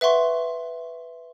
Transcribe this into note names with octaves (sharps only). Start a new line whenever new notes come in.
B4 E5 F#5 C6 C#6